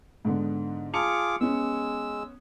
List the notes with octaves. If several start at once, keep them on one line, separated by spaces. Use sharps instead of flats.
G#2 D3 B3
F4 G#4 A5 D6 C#7 F7
G#3 B3 C#4 E6